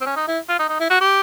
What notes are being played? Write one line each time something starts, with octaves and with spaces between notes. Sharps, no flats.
C4
C#4
D#4
E4
F4
D#4
D#4
E4
F#4
G4